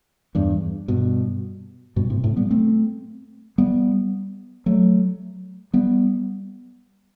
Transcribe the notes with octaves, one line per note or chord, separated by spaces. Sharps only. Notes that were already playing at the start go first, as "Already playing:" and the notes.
E2 G2
G2 B2
G2 B2
A2 C3
A2 C3
G3 B3
A3 C4
G3 B3
F#3 A3
G3 B3